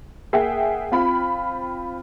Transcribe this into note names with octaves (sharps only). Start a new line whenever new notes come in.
A#3 G#4 E5 F#5 G5
C4 F4 B5